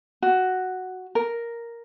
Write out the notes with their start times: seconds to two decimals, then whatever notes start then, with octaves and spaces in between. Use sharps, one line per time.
0.22 F#4
1.15 A#4